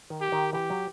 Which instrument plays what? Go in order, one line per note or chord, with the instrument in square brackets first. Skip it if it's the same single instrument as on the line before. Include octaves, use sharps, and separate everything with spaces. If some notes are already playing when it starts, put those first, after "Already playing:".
[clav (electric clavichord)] D#3
[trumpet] G4
[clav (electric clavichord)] D#3
[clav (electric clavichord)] E3 [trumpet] G4
[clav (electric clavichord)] F#3